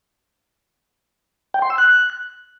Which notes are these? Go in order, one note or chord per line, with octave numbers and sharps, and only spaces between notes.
G5
C6
E6
F#6